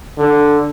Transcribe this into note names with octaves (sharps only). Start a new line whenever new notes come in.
D3